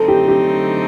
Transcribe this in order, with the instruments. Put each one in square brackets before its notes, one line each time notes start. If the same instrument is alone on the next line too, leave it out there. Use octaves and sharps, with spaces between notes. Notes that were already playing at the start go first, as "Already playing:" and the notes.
Already playing: [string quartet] D3 F#3 A3 C4 D#4 [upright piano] A4
[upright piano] G4
G4